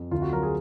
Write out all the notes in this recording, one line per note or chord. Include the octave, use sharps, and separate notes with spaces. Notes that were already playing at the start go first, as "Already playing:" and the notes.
Already playing: F2
D2 F4
F#4
F#3 A#4
G#4